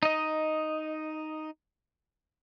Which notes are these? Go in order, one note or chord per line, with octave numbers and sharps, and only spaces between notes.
D#4 D#5